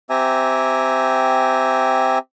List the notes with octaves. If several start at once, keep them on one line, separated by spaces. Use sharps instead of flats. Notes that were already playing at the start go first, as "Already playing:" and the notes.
C4 G4 E5 G#5 A#5